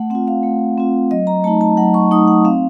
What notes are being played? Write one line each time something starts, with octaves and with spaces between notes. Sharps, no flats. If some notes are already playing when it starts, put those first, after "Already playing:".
Already playing: A3 F#5
C4 F4 F#5
F5
A3
C4 F4
F#3 D#5
A#5
A3 D#4 A5
A5
F#3 F#5
C#6
A3 D#4 D#6
F#5
C4 F5